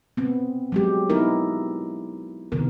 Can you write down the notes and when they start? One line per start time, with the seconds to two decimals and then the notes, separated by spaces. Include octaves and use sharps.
0.17 B3 C4
0.72 F#3 G#3 G4
1.10 B3 D#4 E4 A#4
2.52 C3 D#3 B3 A#4